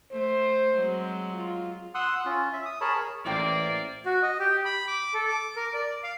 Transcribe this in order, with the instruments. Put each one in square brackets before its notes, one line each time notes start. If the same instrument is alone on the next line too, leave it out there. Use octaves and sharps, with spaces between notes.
[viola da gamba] A3 [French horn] C5
[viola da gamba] F#3 G#3 C4
[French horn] F4
[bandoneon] F#5 C6 D#6 E6 F#6
C#4 F4
E5
D#6
G#4 A#4 C#5 A5 B5
[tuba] A1 [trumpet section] A#3 D5 [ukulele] E4 C5 G5
[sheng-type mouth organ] F#4
D#5
G4
B5
D6
A4
D6
A#4
D5
F5